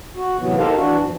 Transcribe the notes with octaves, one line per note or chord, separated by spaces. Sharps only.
F#4
A2 C3 E3 F#3 B3
D#4 G4 A4 A#4 C5 F5
E3 D4 F#4
F#2 A2 E3 F3